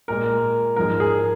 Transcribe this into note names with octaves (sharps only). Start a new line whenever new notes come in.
A#2 G#3 A#4
G#2 F3 G#3 A#4
G#4